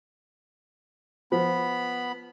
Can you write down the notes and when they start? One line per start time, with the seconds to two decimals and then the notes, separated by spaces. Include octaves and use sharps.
1.32 F3 B3 B5